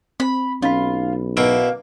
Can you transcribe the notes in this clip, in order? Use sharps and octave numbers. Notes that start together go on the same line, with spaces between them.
C4 B5
B1 C#4 D#4 F4 B5
B2 A#3 E4